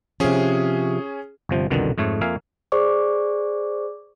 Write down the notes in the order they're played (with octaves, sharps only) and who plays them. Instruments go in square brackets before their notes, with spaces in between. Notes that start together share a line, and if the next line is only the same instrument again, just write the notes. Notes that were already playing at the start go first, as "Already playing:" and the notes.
[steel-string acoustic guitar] C3 F3 [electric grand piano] C#4 G#4
[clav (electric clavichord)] G1 C3 F3
C2 F2 B2 D3 D#3
F2 G#2 A3 C#5
F2 A#3 E5 F5 G#5
[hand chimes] G#4 C5 D5 C#6 D6